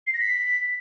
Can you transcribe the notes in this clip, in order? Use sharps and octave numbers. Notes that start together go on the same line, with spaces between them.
C7
A#6
B6